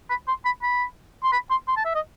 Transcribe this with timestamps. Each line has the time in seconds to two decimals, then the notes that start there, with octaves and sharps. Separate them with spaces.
0.10 B5
0.28 C6
0.45 B5
0.63 B5
1.24 C6
1.33 B5
1.50 C6
1.68 C6
1.77 A5
1.85 E5
1.95 D#5